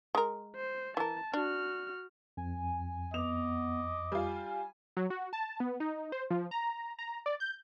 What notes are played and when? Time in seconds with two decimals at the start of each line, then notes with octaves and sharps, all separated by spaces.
0.15 G#3 A#4
0.56 C5
0.97 E3 A#4 A5
1.34 D4 F#4 F6
2.37 F2 G#5
3.14 B3 D#5 D6 F7
4.12 G3 F4 G#5
4.97 F#3
5.10 F#4
5.33 A5
5.60 B3
5.80 D#4
6.12 C5
6.30 F3
6.51 A#5
6.99 A#5
7.26 D5
7.40 G6